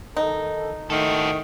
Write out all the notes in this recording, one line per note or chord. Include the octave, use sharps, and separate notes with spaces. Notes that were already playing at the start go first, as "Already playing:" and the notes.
D#3 D#4 A4
A2 D#3 A3 F#4 A4